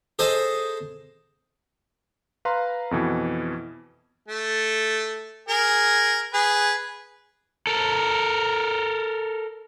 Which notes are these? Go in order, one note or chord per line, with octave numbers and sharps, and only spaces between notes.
G#4 A4 C5 D#5
B4 F5 A#5 C6
F2 B2 E3
A3
G#4 A#4
G#4 B4
A4 A#4